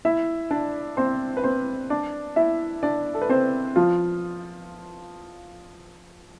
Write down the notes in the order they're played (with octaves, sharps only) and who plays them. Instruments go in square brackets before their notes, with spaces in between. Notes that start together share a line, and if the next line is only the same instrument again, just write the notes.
[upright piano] E4 E5
D4 D5
C4 C5
B4
C4 C5
D4 D5
E4 E5
D4 D5
A4
B4
C4 C5
F3 F4